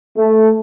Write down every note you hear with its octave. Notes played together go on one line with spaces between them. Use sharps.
A3